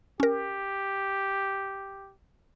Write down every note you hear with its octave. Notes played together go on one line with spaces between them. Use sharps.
C#4 G4 A#4